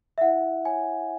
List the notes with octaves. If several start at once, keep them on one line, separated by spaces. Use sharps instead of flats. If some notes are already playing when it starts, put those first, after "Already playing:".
E5
E4 F#5
C#5 G#5